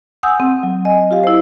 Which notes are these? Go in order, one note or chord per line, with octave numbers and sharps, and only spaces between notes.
F#5 G#5 D#6 E6 G6
C4
F#3
D#5 G#5
F4 G4 F5
E4 C5